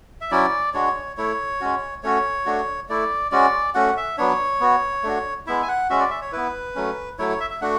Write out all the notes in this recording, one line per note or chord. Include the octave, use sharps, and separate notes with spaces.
E5
F#3 C#4 E4 D5
G#3 D4 F#4 C#5
A3 E4 C#5
G#3 C#4 F#4
A3 C#4 F#4 C#5
A3 D4 F#4
A3 E4 D5
G#3 C#4 F#4 D5
A3 C#4 F#4 F#5
E5
F#3 B3 D4 C#5
B3 F#4
A3 D4 F#4
G#3 B3 E4 E5
G#5
F#5
G#3 C#4 F#4 E5
D5
E5
C#5
B3 E4 B4
F#3 A3 C#4
F#3 A3 E4 C#5
C#5
E5
E5
A3 D4 F#4 F#5